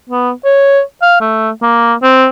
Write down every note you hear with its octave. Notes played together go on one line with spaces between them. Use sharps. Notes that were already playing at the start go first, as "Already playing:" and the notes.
B3
C#5
F5
A3
A#3
C4